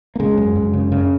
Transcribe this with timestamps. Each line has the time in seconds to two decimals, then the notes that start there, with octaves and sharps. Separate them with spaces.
0.16 A#3
0.20 C#3 G#3
0.38 F#2
0.55 F#2
0.73 C#3
0.92 C#3